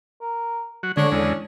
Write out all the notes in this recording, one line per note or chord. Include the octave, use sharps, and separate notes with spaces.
A#4
F#3 F#4
D3 G#3 C#4 D4 C#5
E2 G#3 C#4